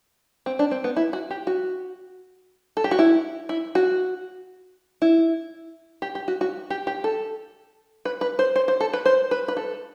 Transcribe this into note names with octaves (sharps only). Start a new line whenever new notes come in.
C4
D4
C4
B3
E4
F#4
G4
F#4
A4
G4
F#4
E4
E4
F#4
E4
G4
G4
F#4
F#4
G4
G4
A4
B4
B4
C5
C5
C5
A4
B4
C5
B4
B4
A4